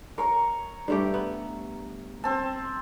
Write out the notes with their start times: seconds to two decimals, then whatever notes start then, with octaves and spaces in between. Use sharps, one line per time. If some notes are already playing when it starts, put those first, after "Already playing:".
0.18 A#4 C#5 A#5 C#6
0.88 G2 A3 G4
1.14 B3
2.24 C4 A5